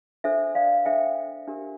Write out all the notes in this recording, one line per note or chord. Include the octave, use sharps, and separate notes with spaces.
D4 A4 C5 E5
D5 F5
D4 A4 C5 E5 G5
D4 G4 A#4